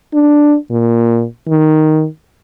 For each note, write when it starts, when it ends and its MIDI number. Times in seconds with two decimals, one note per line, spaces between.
0.13 0.56 62
0.71 1.25 46
1.48 2.06 51